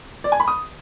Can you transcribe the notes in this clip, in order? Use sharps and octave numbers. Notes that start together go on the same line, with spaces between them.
D5
G#5
B5
D#6